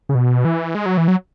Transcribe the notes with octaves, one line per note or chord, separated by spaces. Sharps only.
C#3
B2
E3
G#3
F#3
E3
F#3